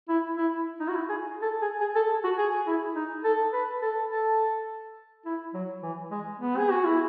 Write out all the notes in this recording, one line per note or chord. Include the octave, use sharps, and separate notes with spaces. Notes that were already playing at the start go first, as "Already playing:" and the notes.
E4
E4
D#4
F#4
E4
G#4
A4
G#4
G#4
A4
F#4
G#4
E4
D#4
A4
B4
A4
A4
E4
F#3
E3
G#3
B3
G#4
F#4
E4